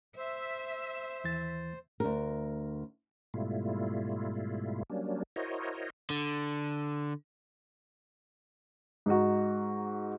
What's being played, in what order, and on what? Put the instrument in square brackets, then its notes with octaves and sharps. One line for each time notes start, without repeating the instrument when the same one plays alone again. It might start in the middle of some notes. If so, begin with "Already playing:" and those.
[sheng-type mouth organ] C5 [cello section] E5
[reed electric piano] D#2 E3 A6
[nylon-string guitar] D2 A#4
[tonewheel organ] G#2 B2 G3 A3 E4 F4
F#3 G3 A#3 C#4 D4
E4 F#4 A#4 C5 C#5 D#5
[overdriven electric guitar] D3
[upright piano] G#2 D#4 F#4